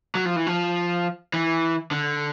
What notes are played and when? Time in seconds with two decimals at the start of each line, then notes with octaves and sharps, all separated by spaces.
0.15 F#3
0.25 F3
0.36 E3
0.47 F3
1.34 E3
1.91 D3